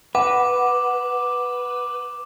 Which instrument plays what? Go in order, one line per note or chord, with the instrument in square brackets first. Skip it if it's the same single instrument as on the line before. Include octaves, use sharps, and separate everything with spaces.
[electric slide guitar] B4 [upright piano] F#5 [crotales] D6